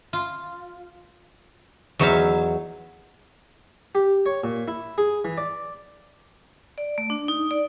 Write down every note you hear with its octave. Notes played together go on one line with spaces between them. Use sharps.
F4
E2 F#3 D#4 C#5 E5 F5
G4
C#5
A#2
E4
G#4
E3
D5
D5
A3
D4
D#4
D5